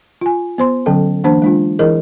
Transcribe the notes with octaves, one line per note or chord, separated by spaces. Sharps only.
F4 G#5
B3 C5 C6
D3 F#3 C#4 A4 G5
E3 A#3 D4 C5 A5
G#3 D4 F4
E3 E4 G#4 A#4 D#5